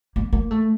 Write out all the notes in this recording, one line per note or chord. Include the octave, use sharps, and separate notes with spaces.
A#3
A#3
A3